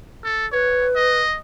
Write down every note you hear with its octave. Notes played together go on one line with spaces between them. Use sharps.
A4
B4 C#5
D#5